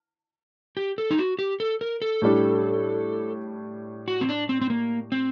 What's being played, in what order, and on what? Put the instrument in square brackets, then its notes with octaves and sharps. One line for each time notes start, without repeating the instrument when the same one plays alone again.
[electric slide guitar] G4
A4
D#4
F#4
G4
A4
A#4
A4
[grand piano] A2 G3 D4
[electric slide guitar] F#4
C4
D4
C4
C4
A#3
C4